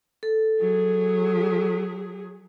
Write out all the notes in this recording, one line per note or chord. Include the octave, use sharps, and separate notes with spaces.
A4
F#3 G#4